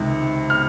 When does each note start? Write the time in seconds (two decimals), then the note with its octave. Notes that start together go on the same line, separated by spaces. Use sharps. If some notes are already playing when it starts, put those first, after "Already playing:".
Already playing: C#2 C3 D#3
0.50 F6